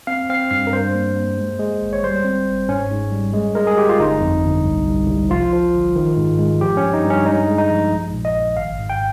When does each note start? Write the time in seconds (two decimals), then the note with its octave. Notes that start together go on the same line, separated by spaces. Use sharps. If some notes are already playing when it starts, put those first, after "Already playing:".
0.07 C4 F5
0.30 C4 F5
0.51 G2 F5
0.67 A#4
0.72 G2 C5
0.95 A#3
1.16 A#3
1.38 G#3
1.59 G#3
1.82 G#1
1.93 C#5
2.04 G3 C5
2.25 C4
2.47 G1
2.69 G#2 C#4
2.90 G#2
3.12 G3
3.34 G#3
3.55 G#3 A#4
3.67 G#4
3.77 G#3 G4
3.89 F4
3.99 G1 D#4
4.21 F2
4.44 G1
4.65 C2
4.86 C2
5.08 C2
5.30 F3 F4
5.53 F3
5.74 G1
5.96 D#3
6.17 G#2
6.39 G#3
6.61 F3 G4
6.77 C#4
6.83 G2
6.94 D#4
7.04 G2
7.10 C#4
7.26 G#3 D#4
7.47 G#3
7.58 D#4
7.70 F3
7.92 A#1
8.14 A#2
8.25 D#5
8.35 A#1
8.56 G#1 F5
8.79 G#2
8.90 G5